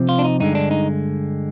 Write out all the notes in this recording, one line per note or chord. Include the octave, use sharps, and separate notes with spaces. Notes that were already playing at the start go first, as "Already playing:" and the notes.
Already playing: C3 F3 C4
F4
D4
D#4
G2 D3 G#3 D#4
D4
D#4